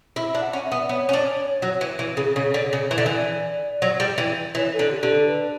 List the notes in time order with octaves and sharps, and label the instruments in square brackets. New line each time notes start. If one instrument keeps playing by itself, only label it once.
[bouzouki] E4 [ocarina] E5
[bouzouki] D4
[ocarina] F#5
[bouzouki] C#4
[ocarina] E5
[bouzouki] B3
[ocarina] D5
[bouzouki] B3 [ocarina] C#5
[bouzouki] C#4
D4
F#3
E3
E3
C#3
[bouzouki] C#3 [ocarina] C#5
[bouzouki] D3
C#3
E3
D3
[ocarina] E5
[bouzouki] E3 [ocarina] D5
[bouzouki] F#3
G3
E3
[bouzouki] E3 [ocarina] C#5
[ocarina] A4
[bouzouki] D3
[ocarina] G4
[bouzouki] D3
[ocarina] A4
B4